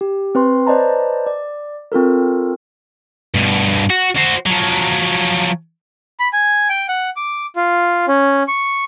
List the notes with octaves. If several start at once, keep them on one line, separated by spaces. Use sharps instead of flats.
G4
C4 B4 C6
B4 C5 D5 D#5 A5 A#5
D5
C4 F4 A4 A#4
G2 B2
F#4
F#4 C5
F3 F#3
B5
G#5
G5
F#5
D6
F4
C#4
C#6